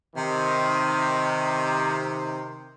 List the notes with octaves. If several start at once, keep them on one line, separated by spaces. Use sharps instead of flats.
C3 D#3